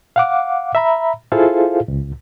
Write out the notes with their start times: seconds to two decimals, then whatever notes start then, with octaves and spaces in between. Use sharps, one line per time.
0.16 F5 F#5 D6
0.75 E5 A#5 B5
1.32 E4 F4 G#4 A4 C5 F5
1.88 C#2